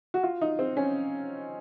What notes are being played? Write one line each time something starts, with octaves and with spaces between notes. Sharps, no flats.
F#4
F4
D#4
C4
C#4